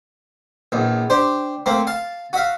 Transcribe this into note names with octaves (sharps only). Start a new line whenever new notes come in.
A#1 E2
D4 G4 C5
A3 A#3 C4
F5 A5
F#4 E5 F5